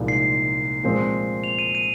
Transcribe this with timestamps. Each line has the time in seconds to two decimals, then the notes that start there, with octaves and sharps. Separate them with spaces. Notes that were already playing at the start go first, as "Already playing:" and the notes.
Already playing: C2 A#2 F3 G#3 D#4
0.08 C7
0.84 A#2 F3 G#3 C4
1.44 F7
1.59 D#7
1.75 D#7